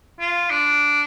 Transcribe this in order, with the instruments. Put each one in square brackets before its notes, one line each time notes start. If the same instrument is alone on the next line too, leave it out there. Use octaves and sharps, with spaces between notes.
[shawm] F4
D4